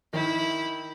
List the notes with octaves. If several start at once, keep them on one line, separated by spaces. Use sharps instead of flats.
D#3 E4